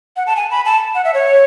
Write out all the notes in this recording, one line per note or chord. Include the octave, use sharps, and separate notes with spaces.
F#5
A5
G#5
B5
A5
F#5
E5
C#5